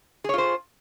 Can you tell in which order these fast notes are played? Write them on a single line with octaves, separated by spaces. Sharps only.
G#4 C#5 F4 C5